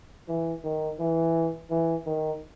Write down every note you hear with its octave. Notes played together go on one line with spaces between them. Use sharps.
E3
D#3
E3
E3
D#3